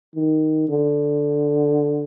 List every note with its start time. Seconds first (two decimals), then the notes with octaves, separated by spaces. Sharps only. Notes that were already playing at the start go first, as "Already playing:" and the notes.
0.15 D#3
0.68 D3